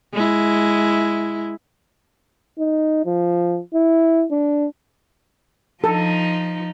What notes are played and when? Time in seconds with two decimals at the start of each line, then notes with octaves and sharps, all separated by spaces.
0.14 G#3 E4
2.58 D#4
3.06 F3
3.74 E4
4.31 D4
5.84 F3 D#4 A4